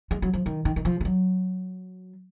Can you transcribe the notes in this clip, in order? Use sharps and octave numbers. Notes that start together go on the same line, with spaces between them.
G#3
F#3
F3
D#3
D#3
D#3
F3
G#3
F#3